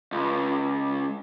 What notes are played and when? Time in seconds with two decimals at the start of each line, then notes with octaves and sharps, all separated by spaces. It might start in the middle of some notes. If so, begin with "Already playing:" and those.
0.12 C#2